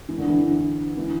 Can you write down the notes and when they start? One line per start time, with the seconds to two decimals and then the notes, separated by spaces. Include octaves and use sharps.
0.09 E3
0.18 D3
0.28 E3
0.97 E3